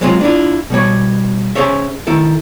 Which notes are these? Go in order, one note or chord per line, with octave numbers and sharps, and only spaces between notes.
F#3 G#3 B3 C4 F4
D4 E4 F4
B2 G3 C#5
C#4 G#4 C5 C#5 E5
D#3 E4 A4